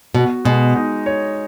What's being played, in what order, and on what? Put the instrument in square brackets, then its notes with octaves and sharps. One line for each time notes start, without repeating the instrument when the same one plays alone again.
[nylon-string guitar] B2 [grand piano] F#4
[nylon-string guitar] B2 [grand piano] G#3
[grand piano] D#4
C#5